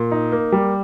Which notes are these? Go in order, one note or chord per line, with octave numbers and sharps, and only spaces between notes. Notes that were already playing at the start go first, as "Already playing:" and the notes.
Already playing: A#2
D#4
A#3
G3